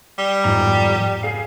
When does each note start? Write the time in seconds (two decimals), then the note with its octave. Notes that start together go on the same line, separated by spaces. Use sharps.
0.18 G3
0.44 F2 G#2 A#5
1.23 G#4 F5